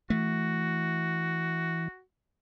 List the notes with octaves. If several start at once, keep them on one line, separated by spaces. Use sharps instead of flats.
E3 A3 F#4